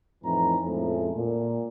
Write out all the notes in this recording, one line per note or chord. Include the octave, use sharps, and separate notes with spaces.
F2 A2 E3 D#4 A#5
F2 A2 F3 G#3 A3 C#4
A#2